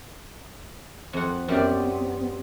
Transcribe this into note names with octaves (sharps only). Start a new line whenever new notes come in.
F2 F#5
F#2 B3 C4 G4 D5